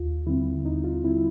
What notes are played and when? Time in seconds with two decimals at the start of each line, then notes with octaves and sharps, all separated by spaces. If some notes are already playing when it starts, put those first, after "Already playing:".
Already playing: D#2 F4
0.26 D3 G3 C4 E4
0.65 D#2 D#4
0.84 F4
1.04 D3 G3 C4 E4